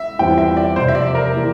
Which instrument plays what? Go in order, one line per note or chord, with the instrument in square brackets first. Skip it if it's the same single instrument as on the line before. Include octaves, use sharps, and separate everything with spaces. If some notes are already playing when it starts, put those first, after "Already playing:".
Already playing: [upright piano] E5
[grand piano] E2 E3 G3 C4 F4 [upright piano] G5
[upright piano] E5
D5
[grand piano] F2 C3 F3 [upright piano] C5
[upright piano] E5
D5
A#4
[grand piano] E3 A#3 E4 G4